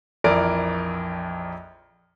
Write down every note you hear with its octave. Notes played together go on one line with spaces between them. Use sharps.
A#1 F2 E3 A#4 D5 D7